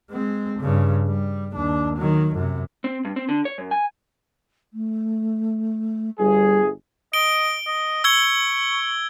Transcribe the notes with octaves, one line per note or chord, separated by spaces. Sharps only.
G#3 C4
G2 C#3
G3
D#2 D4
D#3 F#3
F#2 C3
C4
G2
C4
D3
C#5
F#2
G#5
A3
G1 G3 G#4
D#5 D7 G7
D#5
C#6 E6 G#6 G7